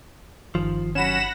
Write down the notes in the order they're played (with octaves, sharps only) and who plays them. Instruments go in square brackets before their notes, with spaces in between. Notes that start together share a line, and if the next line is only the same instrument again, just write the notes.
[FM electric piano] G1 D#3 [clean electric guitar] F3
[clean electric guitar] F#3 C#4 [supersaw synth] F#5 B5 A#6 [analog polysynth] E7